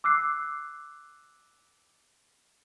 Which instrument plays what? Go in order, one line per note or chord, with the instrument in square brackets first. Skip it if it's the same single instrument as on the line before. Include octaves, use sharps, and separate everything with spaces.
[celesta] D6 E6 F#6 C7